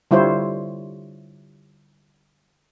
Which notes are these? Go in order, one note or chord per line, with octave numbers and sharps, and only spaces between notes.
D3 G3 E4 F4 C5 C#5